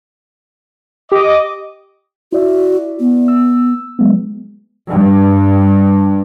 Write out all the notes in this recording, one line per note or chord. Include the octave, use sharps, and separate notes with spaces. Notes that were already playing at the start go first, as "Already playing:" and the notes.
G4 D#5 D6
E4 F#4 D5 E5
B3
E6
F#3 G#3 B3
G2